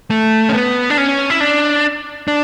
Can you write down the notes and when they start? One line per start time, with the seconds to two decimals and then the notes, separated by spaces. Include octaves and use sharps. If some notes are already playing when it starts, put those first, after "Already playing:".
0.10 A3
0.49 C#4
0.54 B3
0.90 D4
0.97 C#4
1.30 E4
1.40 D4
2.28 D4